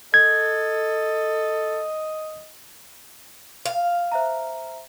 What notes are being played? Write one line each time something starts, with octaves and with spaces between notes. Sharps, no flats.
A4 D#5 G#6
F5
C5 E5 A#5